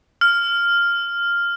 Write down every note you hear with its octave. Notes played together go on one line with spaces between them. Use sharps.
F6